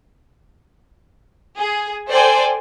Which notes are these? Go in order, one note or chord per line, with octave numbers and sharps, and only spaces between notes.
G#4
A4 C5 D5 G5 G#5